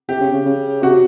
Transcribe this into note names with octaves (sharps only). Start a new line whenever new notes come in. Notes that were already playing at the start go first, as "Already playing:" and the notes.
C3 G4
C#3
C#3
C#3
C3 F#4